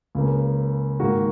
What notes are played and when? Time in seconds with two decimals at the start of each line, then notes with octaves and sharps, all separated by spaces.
0.15 C#2 C#3 A#3
1.00 G#2 D#3 A#3 F#4